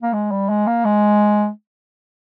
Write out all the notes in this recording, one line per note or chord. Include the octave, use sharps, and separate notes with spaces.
A#3
G#3
G3
G#3
A#3
G#3